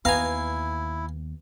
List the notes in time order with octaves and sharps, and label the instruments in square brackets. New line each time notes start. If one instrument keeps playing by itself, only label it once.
[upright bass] D#2 [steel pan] B3 A#5 [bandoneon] E4 [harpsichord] F5 G#5